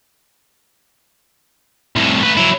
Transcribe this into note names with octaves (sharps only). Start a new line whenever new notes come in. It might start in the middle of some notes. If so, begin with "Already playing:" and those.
C2 A2
A3 B4
F#3 E4